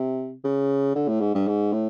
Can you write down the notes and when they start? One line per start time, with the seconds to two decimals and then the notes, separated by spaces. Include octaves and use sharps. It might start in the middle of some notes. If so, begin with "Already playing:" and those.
Already playing: C3
0.44 C#3
0.95 D3
1.08 A2
1.21 G#2
1.35 G2
1.48 G#2
1.73 A2